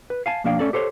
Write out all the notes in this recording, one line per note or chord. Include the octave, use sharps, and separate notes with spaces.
B4
F5 G#5 A5
B1 F3 A#3 D4 F5 G5
A3 C#4 A4 D5
G4 A4 C5 C#5